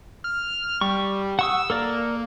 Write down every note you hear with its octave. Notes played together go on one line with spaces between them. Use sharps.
F6
G3 C#6
F#5 C#6 D#6 E6
A#3 A4 A#4 D5